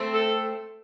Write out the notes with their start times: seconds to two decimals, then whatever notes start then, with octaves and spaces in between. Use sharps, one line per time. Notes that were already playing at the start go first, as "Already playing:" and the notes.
Already playing: A3 C4
0.14 A4